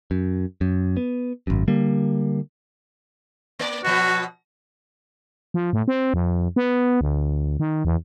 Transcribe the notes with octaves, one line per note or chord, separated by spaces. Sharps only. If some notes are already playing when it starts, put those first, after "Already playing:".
F#2
F#2
B3
G#1 F#2
D3 G3 A#3
A#3 D5
B2 F3 B3 F#4
F3
A2
C4
F2
B3
D2
D#3
E2